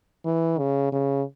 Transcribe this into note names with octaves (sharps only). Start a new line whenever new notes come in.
E3
C#3
C#3